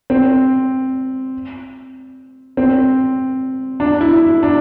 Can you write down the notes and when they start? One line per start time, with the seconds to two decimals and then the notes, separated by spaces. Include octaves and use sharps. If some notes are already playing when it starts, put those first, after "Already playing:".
0.10 C4
2.57 C4
3.80 D4
4.01 E4
4.43 D4